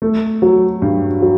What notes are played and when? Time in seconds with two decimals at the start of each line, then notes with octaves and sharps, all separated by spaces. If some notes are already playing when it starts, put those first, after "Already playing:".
0.02 A3
0.42 F#3
0.82 G2
1.22 F#3